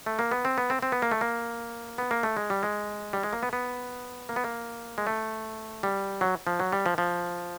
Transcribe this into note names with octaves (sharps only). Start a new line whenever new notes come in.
A3
A#3
B3
C4
B3
C4
C4
B3
A#3
A3
A#3
B3
A#3
A3
G#3
G3
G#3
G3
G#3
A#3
B3
B3
A#3
B3
A#3
G#3
A3
G3
F#3
F3
F#3
G3
F3
F3